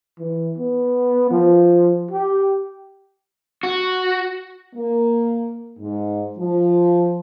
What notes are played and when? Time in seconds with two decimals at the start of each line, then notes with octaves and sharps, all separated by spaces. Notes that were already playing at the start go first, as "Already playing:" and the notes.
0.19 E3
0.58 B3
1.30 F3
2.11 G4
3.63 F#4
4.76 A#3
5.79 G#2
6.39 F3